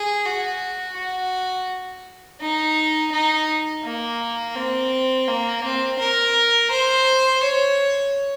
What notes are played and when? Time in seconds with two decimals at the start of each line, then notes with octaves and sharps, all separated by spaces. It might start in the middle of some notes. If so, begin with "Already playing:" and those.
Already playing: G#4
0.26 F#4
0.97 F#4
2.40 D#4
3.12 D#4
3.84 A#3
4.55 C4
5.28 A#3
5.64 C4
5.99 A#4
6.71 C5
7.43 C#5